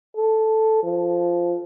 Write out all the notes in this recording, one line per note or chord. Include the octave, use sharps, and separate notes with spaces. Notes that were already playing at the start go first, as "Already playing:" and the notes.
A4
F3